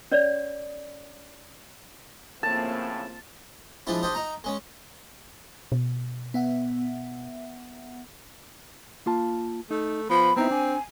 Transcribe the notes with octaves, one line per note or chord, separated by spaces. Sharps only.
C#4 C#5 D5
A2 C#3 F3 A#3 C4 A5
F3 G#3 D4 E4
D4 G4 C5 D#5
D#4 A#5
G#3 C#4
B2
B3 E5 F#5
A#3 F4 A5
A3 D#4
F3 B3 B5
B3 C4 D#4 E4 A#5
D4 G#5